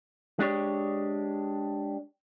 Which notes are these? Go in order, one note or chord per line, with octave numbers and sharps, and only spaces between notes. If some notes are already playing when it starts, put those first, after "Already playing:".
G#3 D4 G4 C#5